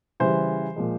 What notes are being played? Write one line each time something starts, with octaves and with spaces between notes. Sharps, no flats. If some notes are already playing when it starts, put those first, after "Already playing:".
C#3 E3 G3 C5
A#2 F3 G#3